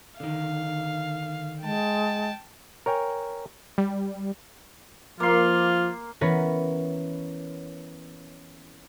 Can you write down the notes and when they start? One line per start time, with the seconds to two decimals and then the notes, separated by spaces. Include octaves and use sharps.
0.20 D3 D#3 F5
1.62 G#3 G5 A5
2.86 A#4 C#5 G5 G#5
3.78 G3
5.20 F3 A#3 F4 C6
6.21 E3 B3 C#4 A#4 B4 C#5